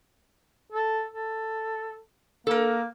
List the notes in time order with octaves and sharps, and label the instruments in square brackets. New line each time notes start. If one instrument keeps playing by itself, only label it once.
[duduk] A4
A4
[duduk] A#3 [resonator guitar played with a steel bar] A4 A#4